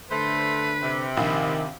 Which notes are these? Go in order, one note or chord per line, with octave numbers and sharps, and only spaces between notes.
D3 A3 B4 C5
C3
A#1 D#3